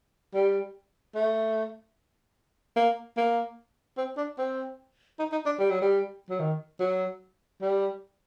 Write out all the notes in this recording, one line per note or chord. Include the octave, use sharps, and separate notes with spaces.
G3
A3
A#3
A#3
C4
D4
C4
D#4
D#4
D4
G3
F#3
G3
F#3
D#3
F#3
G3